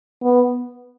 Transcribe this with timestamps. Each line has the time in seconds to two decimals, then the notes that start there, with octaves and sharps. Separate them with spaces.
0.22 B3